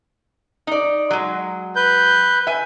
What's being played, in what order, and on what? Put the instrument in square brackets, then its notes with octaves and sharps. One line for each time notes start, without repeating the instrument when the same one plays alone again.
[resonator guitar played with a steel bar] D#4 D5
F#3 G#3
[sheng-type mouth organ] B4 G6
[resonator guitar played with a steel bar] E5 G#5